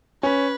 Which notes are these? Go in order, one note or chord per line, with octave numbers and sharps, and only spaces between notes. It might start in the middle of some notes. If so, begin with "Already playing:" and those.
C#4 B4